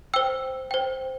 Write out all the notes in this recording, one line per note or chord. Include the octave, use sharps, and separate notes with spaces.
C5 G5 E6
C5 G5